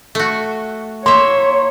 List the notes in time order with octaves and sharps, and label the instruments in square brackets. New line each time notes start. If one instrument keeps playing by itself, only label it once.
[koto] A3 F#4
[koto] A#3 E5 [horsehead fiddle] C#5 [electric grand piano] C6